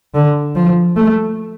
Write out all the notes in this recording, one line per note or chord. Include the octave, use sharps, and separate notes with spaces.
D3
F3
A3